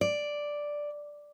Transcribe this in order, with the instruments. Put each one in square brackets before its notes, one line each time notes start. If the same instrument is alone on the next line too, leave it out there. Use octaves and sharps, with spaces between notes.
[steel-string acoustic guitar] D5